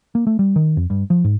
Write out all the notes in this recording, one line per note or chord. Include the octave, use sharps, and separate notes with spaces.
A#3
A3
G3
D#3
F2
G2
F3
G#2